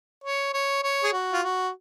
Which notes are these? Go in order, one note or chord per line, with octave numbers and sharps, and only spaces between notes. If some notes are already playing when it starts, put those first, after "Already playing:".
C#5
C#5
C#5
G#4
F#4
F4
F#4